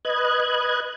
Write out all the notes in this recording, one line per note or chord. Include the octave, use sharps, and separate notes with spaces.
B4 D#5 F#6 G#6